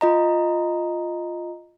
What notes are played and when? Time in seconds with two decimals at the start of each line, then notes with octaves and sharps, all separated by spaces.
0.01 F4 D#5 A#5